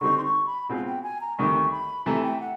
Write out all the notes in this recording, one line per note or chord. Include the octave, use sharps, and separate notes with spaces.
D3 G3 C4 D#4 C#6
C6
C#6
B5
B2 G#3 C4 F4
G5
G#5
A#5
D2 C3 D#3 G3 C#6
B5
C3 E3 A3 A#5
G5
F#5